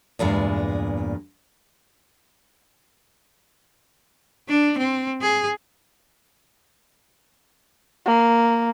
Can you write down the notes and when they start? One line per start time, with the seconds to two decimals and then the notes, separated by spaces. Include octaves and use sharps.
0.19 E2 G2 A#2 G#3
4.48 D4
4.78 C4
5.21 G#4
8.05 A#3